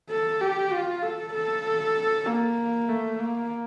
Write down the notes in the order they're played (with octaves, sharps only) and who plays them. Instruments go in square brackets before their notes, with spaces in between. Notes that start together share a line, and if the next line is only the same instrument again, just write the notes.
[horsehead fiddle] A4
G4
F4
A4
A4
A#3
A3
A#3